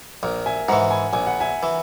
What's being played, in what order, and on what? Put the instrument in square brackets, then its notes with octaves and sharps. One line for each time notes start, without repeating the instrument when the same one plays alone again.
[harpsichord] A#1 [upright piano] A#4
[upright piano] E5 G#5
[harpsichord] G#2 E3 [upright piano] F#5 A#5
[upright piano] G#5 B5
[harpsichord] A#1 [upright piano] G#5
[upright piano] F#5
E5 G#5
[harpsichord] E3